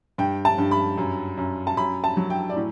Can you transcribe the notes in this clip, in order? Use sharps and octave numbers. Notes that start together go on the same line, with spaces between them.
G2 G5
A5
G2
B5
F#2
F#2
A5
F#2 B5
A5
F#3
G5
D5
A2